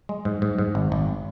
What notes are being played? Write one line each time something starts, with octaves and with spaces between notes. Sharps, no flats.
G#3
G#2
G#2
G#2
G#1
G#1